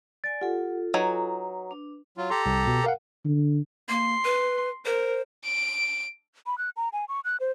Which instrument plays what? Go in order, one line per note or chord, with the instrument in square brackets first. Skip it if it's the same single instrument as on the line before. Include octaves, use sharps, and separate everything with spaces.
[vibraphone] D5 G#5 [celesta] A6
[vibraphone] F4 A4 [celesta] G4 F#5
[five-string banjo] F#3 D#4 G#5 [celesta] B4
[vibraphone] D4
[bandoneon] F#3 F4
[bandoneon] G4 A4 A#5 [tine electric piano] C6
[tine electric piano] C2
B2
A#4 F5 F#5
[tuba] D3
[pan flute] A#3 [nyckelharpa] C6
[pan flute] B4
[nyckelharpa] A#4 [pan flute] C5
[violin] D7
[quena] B5
F#6
A#5
G#5
C#6
F#6
C5